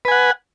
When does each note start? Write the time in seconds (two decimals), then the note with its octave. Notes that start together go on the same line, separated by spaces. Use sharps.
0.05 B4
0.08 G#5
0.11 F#5